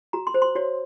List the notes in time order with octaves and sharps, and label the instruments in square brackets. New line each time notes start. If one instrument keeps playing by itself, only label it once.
[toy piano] F#4 A#5
C6
C5
C6
F#4 C#5